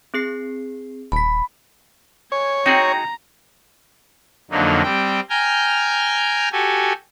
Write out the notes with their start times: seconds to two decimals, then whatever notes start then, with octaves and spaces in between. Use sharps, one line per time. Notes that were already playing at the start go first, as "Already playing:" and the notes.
0.14 C4 G#4 C7
1.12 D#1 A5 B5 B6
2.32 C#5 G#5
2.66 C4 D#4 F#4 G#4 G5 A#5
4.51 F2 D3 F#3 A#3 D#4
4.83 G3 C4 G5
5.30 G5 G#5 A#5 F6 G6
6.52 F#4 G4 A4 G#5